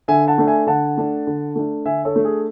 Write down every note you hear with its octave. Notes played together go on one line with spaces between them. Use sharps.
D3 E5 G#5
F#5 A5
A3 D4
E5 G#5
D3 F#5 A5
A3 D4
D3
A3 D4
D3 E5 G#5
A4 C#5
A3 D4
G#4